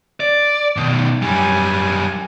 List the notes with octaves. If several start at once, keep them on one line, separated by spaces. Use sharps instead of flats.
D5
B2 D#3
F#2 G3 G#5